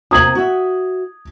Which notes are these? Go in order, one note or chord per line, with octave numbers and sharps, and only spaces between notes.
C3 A#3 D#6 G#6 F#7
F#4 E5